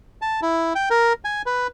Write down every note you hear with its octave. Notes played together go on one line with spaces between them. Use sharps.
A5
E4
G5
A#4
G#5
B4